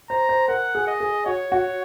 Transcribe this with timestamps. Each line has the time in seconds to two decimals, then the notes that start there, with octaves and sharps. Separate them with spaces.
0.10 C5 A#5
0.29 C5
0.48 A#4 F#5
0.75 G#4
0.87 D#5
1.00 G#4
1.26 F#4 C#5
1.52 F#4